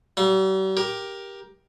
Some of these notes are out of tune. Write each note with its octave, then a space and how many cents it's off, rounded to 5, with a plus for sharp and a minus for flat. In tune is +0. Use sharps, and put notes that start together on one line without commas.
G3 -45 F5 +40
G4 +0 A#4 +15